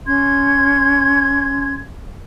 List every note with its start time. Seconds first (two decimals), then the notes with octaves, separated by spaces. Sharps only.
0.06 C#4 C6 G#6